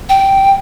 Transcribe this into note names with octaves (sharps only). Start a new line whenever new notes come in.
G5